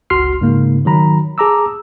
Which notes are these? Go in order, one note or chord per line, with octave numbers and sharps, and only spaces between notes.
G1 C#2 F#4 C6 F6 C7
G#2 C#3 A#3
D#3 F#3 A#5 B5
G#4 A5 A#5 D6 E6